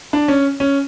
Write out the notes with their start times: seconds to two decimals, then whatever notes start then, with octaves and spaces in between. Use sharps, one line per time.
0.13 D4
0.28 C#4
0.60 C#4